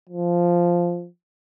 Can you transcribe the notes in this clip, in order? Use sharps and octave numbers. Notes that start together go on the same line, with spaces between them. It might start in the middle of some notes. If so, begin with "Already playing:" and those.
F3